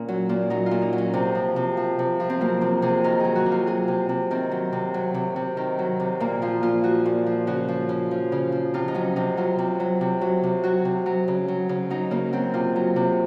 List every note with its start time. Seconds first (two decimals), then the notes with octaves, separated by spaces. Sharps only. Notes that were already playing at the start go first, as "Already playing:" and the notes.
Already playing: A#2 A#3 C#4
0.08 F#3
0.29 A#2
0.50 F#3 D#4
0.66 F4
0.71 A#2
0.82 D#4
0.93 F#3
0.98 C#4
1.14 C3 C4
1.35 F3
1.56 C3
1.77 F3
1.99 C3
2.20 F3
2.30 C4
2.41 F#3 A#3
2.61 C3 C4
2.82 C3 G#4
3.04 D#3 A#4
3.20 F#3 G#4
3.36 F#4
3.46 C3
3.51 F4
3.67 F#3 G#4
3.88 C3
4.09 C3
4.31 D#3 C4
4.51 F#3
4.72 C3
4.94 F#3
5.14 C3
5.36 C3
5.57 D#3
5.79 F#3
6.00 C3
6.20 A#2 A#3
6.42 F3 F4
6.63 A#2 F4
6.84 F3 F#4
7.06 A#2
7.26 F3
7.47 C#3 F#4
7.68 F3
7.89 C#3
8.11 F3
8.32 C#3
8.52 F3
8.74 C3 F4
8.88 D#4
8.94 F#3 C#4
9.16 C3 D#4
9.37 F#3 F4
9.58 C3
9.80 F#3
10.01 C3
10.21 F#3
10.43 C3
10.64 F#3 F#4
10.85 C3
11.06 F#3
11.28 C#3
11.48 F#3
11.69 C#3
11.90 F#3 D#4
12.11 C#3 A#3
12.33 F#3 C4
12.54 C3 F4
12.76 F#3
12.96 C3